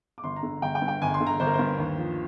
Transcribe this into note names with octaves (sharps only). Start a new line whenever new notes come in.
D6
G1 C6
A#5
D3
G1 G5
G5
G2
G5
G1 G#5
C6
D3
A#5
G1 C5
A#4
C5
G2
D#2
F3